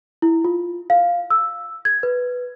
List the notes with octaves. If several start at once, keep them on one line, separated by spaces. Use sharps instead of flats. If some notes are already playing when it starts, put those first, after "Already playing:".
E4
F4
F5
E6
G#6
B4